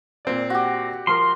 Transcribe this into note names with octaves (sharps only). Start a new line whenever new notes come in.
A#2 C4 D5
F#4 G4
F3 A#4 C6